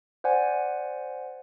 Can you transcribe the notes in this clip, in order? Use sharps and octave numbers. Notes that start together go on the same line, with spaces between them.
C5 D5 F#5 G#5